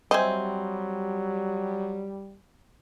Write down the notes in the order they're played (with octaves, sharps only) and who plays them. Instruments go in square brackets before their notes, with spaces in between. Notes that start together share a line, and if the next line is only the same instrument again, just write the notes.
[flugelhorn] F#3 [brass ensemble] G3 [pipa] C4 E5 G#5 [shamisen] C5 D#5